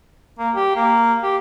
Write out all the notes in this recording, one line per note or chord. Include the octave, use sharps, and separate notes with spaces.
A#3
G4
A#3
G4